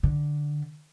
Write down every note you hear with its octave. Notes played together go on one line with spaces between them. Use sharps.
D3